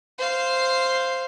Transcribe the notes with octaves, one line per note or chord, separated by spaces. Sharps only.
C5 F5